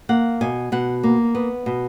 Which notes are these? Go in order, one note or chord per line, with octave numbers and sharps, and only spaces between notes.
A#3 F#5
B2 G#5
B2 F#5
A#3
B3
B2